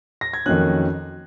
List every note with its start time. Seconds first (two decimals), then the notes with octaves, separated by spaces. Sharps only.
0.21 A#6
0.33 G#6
0.46 F2 D#3 F#3 A#3 C#4 F#6